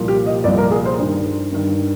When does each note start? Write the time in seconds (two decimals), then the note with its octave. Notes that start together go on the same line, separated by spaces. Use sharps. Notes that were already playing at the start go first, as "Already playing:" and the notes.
Already playing: C2 A#2 F3
0.08 G4
0.26 D#5
0.44 C2 A#2 F3 D5
0.58 A#4
0.71 G#4
0.85 C5
0.98 G2 D#3
1.53 G2 D#3